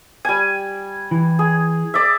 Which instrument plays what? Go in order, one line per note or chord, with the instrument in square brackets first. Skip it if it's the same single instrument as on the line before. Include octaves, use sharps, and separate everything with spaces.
[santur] G3 G#5
[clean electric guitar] E3
[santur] G#4
D5 E5